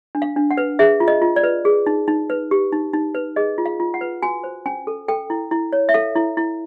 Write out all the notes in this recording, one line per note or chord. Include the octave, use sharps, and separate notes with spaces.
D4
F5
D4
F#5
B4
G#4 E5
F4
D#5
F4
D5
B4
G#4
D#4
D#4
B4
G4
D#4
D#4
B4
G#4 D#5
F4
F5
F4
F#5
B4
F#4 G#5
C5
C#4 G#5
A4
A4 G5
E4
E4
C#5
E5
A4 F5
E4
E4